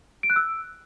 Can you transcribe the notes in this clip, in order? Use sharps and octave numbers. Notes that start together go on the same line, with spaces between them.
D7
F#6
E6